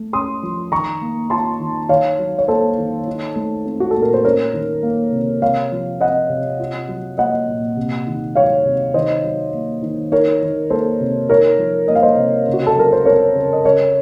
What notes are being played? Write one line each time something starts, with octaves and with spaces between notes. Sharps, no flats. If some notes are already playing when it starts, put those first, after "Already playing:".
Already playing: A3
C#4 C6 D#6
F3
D#3 A#5 C#6
A#3
F4 A5 C6
D#3
D#3 C#5 F5
F#3
C#5
A#3 A4 C5
D#3
D#4
A3
C4
F#4
A#2 A4
A#4
C5
C#4 A#4 C#5
D#3
A#3
C3
C3 C#5 F5
F3
C4 D#5 F#5
C3
F4
F#3
A#3 D#5 F#5
A#2
C3
D#3
F#3 C#5 F5
C3
D#3 C5 D#5
F#3
A#3
D#3
D#4 A#4 C#5
D#3
A#3 A4 C5
C3
D#4 A#4 C#5
F3
A#3 D#5
F5
C5 D#5
C3
C#3
F#4
A4
F#3 A#4
C5
C4 A#4 C#5
C#3
D#5
C#3 A#4 C#5